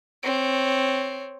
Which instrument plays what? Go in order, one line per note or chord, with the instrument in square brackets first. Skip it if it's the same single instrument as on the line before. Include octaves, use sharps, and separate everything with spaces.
[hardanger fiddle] C4 C#5